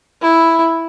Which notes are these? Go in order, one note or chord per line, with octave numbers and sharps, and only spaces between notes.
E4